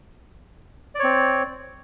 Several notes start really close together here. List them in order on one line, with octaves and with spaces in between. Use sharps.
D5 C#5 C4